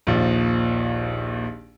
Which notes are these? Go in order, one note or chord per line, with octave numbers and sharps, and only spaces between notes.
A#1 D#2 F3